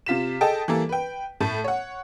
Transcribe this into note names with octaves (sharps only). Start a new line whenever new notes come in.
C3 F4 B6 E7
G#4 A4 D#5 G5 A5
E3 G3 A#3 A4
B4 G5
A2 A3 A5
C#5 F#5